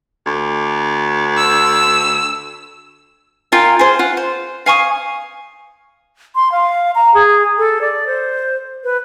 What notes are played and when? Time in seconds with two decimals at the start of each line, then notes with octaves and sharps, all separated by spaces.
0.26 D2
1.36 E6
3.52 F4 A#4 G5 G#5
3.79 G#4 C5
3.99 F4 F#5
4.17 C5
4.66 F5 G#5 C#6 D#6
6.35 C6
6.52 F5
6.95 A#5
7.14 G#4
7.58 A4
7.81 D5
8.07 C5
8.84 B4